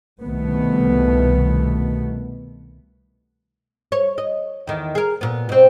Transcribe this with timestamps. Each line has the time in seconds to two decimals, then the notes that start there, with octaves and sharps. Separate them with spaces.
0.23 C2 B2 D#3 A3 B3
3.92 C#5
4.18 D#5
4.67 E2 D#3
4.95 G#4 A#4
5.21 A#2 B3
5.49 B2 C4